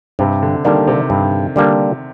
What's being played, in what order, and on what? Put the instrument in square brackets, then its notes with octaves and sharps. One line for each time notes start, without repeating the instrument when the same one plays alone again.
[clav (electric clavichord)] G2 [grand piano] C3
[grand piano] D3
[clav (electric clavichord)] D3 G3 A#3 D4 [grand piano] D#3
[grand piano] C3
[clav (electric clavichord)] G2
D3 G3 A#3 D4